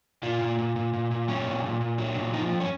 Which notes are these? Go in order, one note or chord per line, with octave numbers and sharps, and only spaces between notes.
A#2 F4
A#2
A#2
A#2
A#2
A#2
F#3 C#4
A#2
A#2
A#2
F#3
A#2
F3 D#4
F2
C#4